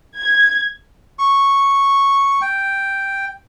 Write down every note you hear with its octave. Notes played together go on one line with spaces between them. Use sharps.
G#6
C#6
G5